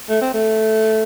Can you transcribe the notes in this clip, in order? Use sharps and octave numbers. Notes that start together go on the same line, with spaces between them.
A3
C4
A3